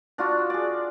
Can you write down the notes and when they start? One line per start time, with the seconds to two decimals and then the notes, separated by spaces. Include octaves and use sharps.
0.18 D4 F4 F#4
0.50 G#4 D5